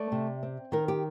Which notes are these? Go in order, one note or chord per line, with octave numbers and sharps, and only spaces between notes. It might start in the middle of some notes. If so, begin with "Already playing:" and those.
Already playing: A3 D5
C3
C4
D#3 A#4
G4